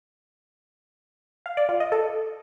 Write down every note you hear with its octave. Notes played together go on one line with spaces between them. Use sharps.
F5
D5
F4
D#5
A4